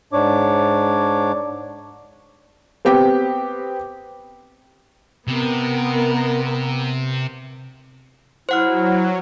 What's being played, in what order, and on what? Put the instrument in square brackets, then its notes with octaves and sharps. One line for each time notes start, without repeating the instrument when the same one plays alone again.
[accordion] G#2 D4 C#5 D6
[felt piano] B3 C4 G4 G5
[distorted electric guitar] C3 [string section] B3 A#4
[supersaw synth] F#3 [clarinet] E4 [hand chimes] C5 F#5 F6